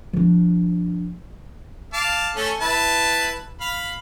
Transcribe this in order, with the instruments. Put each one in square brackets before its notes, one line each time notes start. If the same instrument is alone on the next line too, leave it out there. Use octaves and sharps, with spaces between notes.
[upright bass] F3 D4
[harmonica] F5 A5 D6
A3 C#4 A4
E4 B4 A5
F5 B5